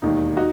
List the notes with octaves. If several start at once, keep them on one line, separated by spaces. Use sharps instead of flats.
E1 D#2 D#3 D#4
D#4 F#4